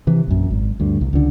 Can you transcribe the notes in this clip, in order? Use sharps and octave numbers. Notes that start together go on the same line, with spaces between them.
C3 E3
A#1 F#2
G#1
D2 G2
C2
C#2 D3